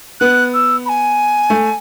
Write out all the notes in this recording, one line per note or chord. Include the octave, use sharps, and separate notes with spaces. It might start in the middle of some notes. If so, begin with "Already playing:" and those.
B3 F#6
E6
B5
G#5
A3